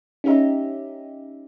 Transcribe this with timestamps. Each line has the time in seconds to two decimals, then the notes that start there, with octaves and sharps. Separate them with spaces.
0.24 C#4 D#4 G4 E5 A#5